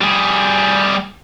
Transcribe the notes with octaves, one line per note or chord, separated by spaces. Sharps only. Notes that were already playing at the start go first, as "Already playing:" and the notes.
G3 G#4